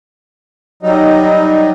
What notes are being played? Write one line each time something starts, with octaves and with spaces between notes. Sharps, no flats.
F#3 G3 D#4